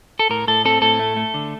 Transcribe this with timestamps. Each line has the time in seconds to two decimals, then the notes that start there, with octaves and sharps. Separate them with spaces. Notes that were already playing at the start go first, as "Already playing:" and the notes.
0.19 A4
0.30 A2 A#4
0.48 A2 A4
0.65 C4 A4
0.82 A2 A4
0.99 A3
1.17 A3
1.34 D3